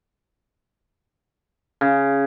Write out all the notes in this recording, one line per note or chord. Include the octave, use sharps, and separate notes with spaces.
C#3